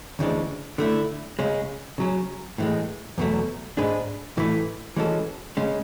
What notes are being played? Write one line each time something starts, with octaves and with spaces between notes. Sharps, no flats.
D2 C#3 E3 G#3 D4
D3 A3 E4
C#3 G#3 C#4
C#3 F#3 C#4
A2 E3 G#3
E2 B2 F#3 A3
G#2 G#3 D4 G#4 B4
A2 E3 A3 E4
E3 G#3 C#4 F#4 A4
C#3 G#3 C#4